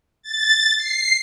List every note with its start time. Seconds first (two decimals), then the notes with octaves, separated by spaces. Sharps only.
0.22 A6
0.77 C7